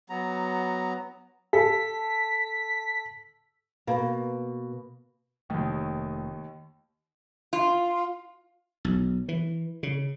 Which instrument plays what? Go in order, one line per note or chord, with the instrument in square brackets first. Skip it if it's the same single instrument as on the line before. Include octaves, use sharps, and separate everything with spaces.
[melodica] F#3 B3 A#5
[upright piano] A4 [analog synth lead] B6
[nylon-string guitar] B2 A#3
[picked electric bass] F1 A3 [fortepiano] D#2 D#3
[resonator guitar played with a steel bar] F4
[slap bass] B1
E3
C#3